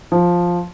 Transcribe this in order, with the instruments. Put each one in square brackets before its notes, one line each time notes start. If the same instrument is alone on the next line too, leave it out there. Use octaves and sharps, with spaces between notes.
[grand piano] F3